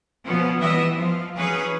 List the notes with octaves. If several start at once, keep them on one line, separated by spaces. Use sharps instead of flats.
B2 F3 B3 C#4
E3 G3 B3 D#5 E5
F3 F5
E3 F#3 C#4 G#4 B4